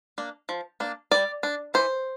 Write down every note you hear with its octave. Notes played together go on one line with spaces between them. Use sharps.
A#3 D4
F3
A#3 D4
G3 D5
D4
E3 C5